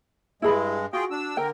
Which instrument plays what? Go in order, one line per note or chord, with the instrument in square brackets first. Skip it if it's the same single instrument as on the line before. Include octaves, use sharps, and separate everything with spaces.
[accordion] G2 G#3 [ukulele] E4 G#4 B5
[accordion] F4 G#4 G5 [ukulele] F#4
[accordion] D4 E6
[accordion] D3 A#4 [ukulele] G5